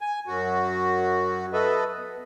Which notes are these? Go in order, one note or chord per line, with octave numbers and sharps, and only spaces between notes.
G#5
F#2 F#4
A4 B4 D#5 E5
B3